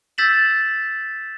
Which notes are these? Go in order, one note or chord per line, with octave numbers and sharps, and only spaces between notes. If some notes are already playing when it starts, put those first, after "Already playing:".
E6 G6 A6 B6 E7 F#7